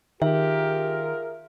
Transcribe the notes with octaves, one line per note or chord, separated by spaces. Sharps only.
D#3 F4 G4 G#4 A#4 E5